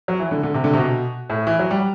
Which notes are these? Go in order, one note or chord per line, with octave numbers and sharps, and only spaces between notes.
F#3
E3
D3
D3
C3
D3
C3
B2
A2
E3
F#3
G3